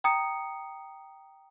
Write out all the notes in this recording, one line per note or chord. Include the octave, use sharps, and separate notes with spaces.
G5 A#5 D#6 C#7